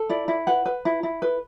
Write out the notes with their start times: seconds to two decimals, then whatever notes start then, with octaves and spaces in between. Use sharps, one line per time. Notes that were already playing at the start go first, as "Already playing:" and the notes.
Already playing: A4
0.09 E4 D5
0.28 E4
0.47 B4 F#5
0.65 B4
0.85 E4
1.03 E4
1.22 B4